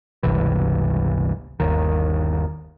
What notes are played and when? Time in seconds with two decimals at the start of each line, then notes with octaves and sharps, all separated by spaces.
0.23 G1 C#2 C3 E3
1.60 G1 D#2 D#3